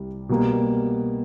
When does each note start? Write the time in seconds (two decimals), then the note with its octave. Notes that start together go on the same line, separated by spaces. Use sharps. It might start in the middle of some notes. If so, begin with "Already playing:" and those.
Already playing: C2 G3
0.29 B2 G3 A#3